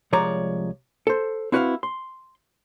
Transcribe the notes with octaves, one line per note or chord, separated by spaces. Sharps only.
C2 F3 G#3 C#5 D5 A#5
A4 C5
C4 E4 F#4 B4 D5 F5
C6